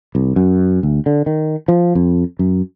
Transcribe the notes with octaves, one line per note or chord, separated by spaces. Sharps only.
C2
F#2
D2
D3
D#3
F3
F2
F#2